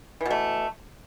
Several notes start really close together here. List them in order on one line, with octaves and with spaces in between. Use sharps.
E3 B2 A3